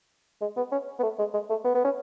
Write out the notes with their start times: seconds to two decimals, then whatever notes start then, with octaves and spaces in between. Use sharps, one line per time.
0.41 G#3
0.57 B3
0.72 C#4
0.99 B3
1.03 A3
1.19 G#3
1.34 G#3
1.50 A3
1.64 B3
1.74 B3
1.84 C#4